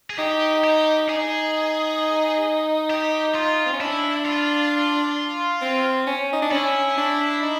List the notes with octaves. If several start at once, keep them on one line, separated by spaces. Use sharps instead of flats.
G#4
D#4 G4
G4
D#4 G#4
G4
F4
C4
C#4
D4 E4
F4
C4
C#4
D#4
D4
C#4 E4
D4
D#4